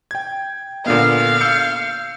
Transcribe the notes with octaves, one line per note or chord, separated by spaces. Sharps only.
G5 G#6
A#2 D3 B3 F5
E6 G6 C#7